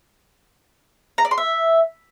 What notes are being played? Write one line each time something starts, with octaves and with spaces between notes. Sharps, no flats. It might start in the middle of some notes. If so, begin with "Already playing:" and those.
A#5
D5
C6
E5